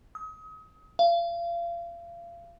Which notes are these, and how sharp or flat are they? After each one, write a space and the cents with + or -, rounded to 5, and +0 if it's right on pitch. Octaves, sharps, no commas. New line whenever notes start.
D#6 +35
F5 -35